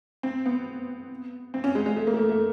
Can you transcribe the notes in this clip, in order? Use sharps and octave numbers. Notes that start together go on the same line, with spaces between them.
C4
B3
C4
C#4
G#3
G#3
A3
A#3
A3
A#3
A3